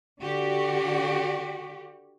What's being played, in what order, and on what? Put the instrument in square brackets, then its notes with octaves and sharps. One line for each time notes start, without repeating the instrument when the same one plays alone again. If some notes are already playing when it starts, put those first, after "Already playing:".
[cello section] D3 F#4 G4